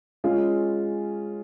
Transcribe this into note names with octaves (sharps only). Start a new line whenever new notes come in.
G#3 C#4 F4